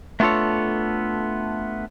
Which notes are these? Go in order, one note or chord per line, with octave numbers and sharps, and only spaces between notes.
A3 B3 D4 F4 A4 C#5